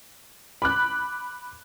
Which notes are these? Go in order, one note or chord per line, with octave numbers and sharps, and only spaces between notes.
B5 D6 F#6